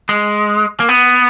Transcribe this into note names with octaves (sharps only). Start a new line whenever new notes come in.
G#3
A#3
B3